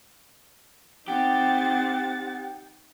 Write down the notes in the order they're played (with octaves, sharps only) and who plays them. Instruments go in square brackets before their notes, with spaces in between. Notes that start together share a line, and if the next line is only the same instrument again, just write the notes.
[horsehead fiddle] C4 [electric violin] D#4 A6 [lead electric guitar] G4 [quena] F#5